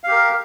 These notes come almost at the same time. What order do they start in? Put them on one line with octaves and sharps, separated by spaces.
F5 G4 A#4